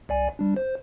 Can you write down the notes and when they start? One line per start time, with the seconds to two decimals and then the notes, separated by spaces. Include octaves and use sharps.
0.09 C2 D5 G#5
0.39 G3 D4
0.56 C5